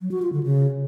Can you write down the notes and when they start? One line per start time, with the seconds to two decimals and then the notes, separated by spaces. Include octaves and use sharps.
0.01 F#3
0.11 F#4
0.22 F4
0.33 D3
0.43 C#3